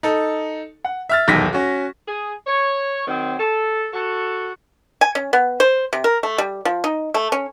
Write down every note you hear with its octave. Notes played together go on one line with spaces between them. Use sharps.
D#4 A4
F#5
E5 F6 A6
D#1 B1 E2 D#3 A#6 B6
C#4 F#4
G#4
C#5
D#3 F#3 C4
A4
F#4 A4
G#5
C#4
B3
C5
C3
A#4
A3
G3
F3
D#4
A3
C#4